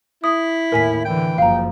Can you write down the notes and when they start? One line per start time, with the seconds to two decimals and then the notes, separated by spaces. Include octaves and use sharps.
0.24 E4 D#6
0.72 D#2 A2 A#4 G#5 B6
1.05 D3 E3 G5
1.38 F#1 F3 F5 A#5